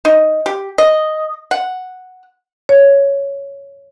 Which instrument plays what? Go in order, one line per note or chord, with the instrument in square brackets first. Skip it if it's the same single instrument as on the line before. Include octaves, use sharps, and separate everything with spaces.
[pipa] D#4
G4
D#5
F#5
[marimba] C#5